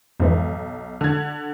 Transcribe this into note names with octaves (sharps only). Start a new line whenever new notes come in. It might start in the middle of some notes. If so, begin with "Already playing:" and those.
B1 F2 G#2 E3
D3 G#6